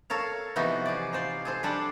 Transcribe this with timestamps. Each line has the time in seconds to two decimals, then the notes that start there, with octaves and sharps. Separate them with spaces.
0.10 A4 A#4 C#5 F5
0.56 C3 E3 F3 B3 D#4 F#4
0.86 G#4 C5 D5
1.13 D#4 F4 C5 D5
1.45 G#4 A4 C5
1.63 G3 D4 A4 C5 D5 F#5